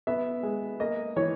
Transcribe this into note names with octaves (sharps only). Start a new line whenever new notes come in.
B3 E5
G#3
A#3 D#5
E3 C#5